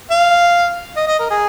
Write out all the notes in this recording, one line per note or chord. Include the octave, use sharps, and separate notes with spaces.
F5
D#5
D#5
A#4
G#4